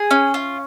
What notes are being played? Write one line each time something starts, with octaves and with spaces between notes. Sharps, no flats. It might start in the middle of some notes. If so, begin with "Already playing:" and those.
Already playing: G#4
C#4
F4